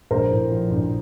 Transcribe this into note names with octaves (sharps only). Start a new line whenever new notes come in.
A#1 A#4 C5
A2
F3
A#1